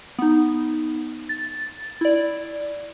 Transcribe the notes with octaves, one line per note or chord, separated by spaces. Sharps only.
B3 D#4
A6
E4 D5